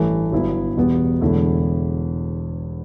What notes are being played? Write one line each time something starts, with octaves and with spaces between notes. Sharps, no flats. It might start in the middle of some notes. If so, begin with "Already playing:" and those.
Already playing: A1 G2 E3 A3
G1 G2 F#3 B3 E4
E2 B2 G3 B3 F#4
E1 E2 D3 A3 E4